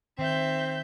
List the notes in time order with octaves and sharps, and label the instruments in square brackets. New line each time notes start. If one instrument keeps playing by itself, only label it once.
[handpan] D#3 [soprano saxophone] C4 [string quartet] E5 G6